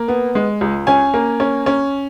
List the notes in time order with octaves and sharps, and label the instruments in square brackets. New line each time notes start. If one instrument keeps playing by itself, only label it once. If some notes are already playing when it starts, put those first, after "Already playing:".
Already playing: [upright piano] A#3
B3
G#3
C#2
C#4 G#5
A#3
C#4
C#4